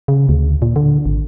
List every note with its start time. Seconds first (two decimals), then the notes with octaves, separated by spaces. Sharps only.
0.08 C#3
0.29 D2
0.62 A#2
0.76 D3
1.06 G#1